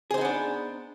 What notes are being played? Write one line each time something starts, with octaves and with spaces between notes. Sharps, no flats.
B3 D4 D#4 G#4 C5